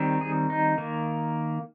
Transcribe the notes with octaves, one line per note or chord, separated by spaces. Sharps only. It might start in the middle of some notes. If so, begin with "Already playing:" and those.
Already playing: D#3 G3 C4
G#4
D#4
D#3 A#3